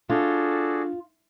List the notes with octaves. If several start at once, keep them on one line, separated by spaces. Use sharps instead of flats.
D4 F4 F#4 G#4 A4 D5